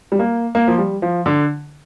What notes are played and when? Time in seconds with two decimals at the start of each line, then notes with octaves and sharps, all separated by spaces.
0.12 G3
0.19 A#3
0.55 A#3
0.68 F3
0.78 G3
1.02 F3
1.26 D3